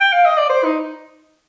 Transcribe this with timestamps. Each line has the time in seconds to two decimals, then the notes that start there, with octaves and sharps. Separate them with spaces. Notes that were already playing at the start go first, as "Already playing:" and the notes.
0.01 G5
0.13 F5
0.26 D#5
0.37 D5
0.50 C5
0.65 D#4